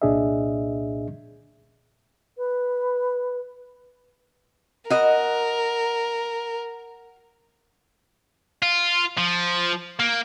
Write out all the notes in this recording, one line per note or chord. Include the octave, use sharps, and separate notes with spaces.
C2 A#2 D4 G#4 D#5 E5
B4
F#4 A#4 D#5
F4
F3
A#3